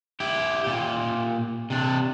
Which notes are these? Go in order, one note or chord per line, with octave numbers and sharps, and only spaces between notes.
E4 G4
A#2 G4
C3 D4